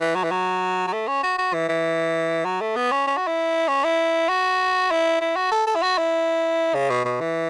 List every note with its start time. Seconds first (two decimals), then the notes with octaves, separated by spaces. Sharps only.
0.01 E3
0.15 F#3
0.24 E3
0.31 F#3
0.87 F#3
0.93 A3
1.08 C#4
1.23 F#4
1.38 F#4
1.54 E3
1.69 E3
2.45 F#3
2.61 A3
2.76 B3
2.92 C#4
3.07 C#4
3.17 F#4
3.27 E4
3.68 C#4
3.84 E4
4.29 F#4
4.91 E4
5.21 E4
5.36 F#4
5.52 A4
5.67 A4
5.75 E4
5.83 F#4
5.98 E4
6.74 C#3
6.90 B2
7.05 B2
7.20 E3